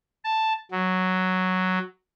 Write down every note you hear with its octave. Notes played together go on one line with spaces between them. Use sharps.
A5
F#3